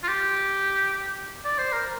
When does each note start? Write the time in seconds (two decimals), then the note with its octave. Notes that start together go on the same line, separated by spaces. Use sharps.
0.04 F4
0.08 G4
1.44 D5
1.58 C5
1.72 A#4